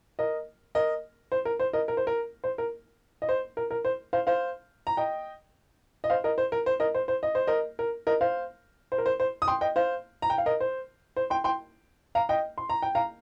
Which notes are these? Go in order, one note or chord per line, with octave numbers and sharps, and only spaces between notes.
A#4 D#5
A#4 D#5
C5
A#4
C5
A#4 D#5
A#4
C5
A#4
C5
A#4
D#5
C5
A#4
A#4
C5
C5 F5
C5 F5
A#5
D#5 G5
D#5
C5 F5
A#4 D#5
C5
A#4
C5
A#4 D#5
C5
C5
D#5
C5
A#4 D#5
A#4
A#4 D#5
C5 F5
C5
A#4
C5
C5
D#6
G5 C6
D#5 G5
C5 F5
A#5
G5
F5
A#4 D#5
C5
C5
G5 C6
G5 C6
F5 A#5
D#5 G5
C6
A#5
G5
F5 A#5